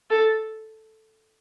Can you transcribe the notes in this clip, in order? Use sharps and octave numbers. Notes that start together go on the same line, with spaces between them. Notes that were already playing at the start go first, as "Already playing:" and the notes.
A4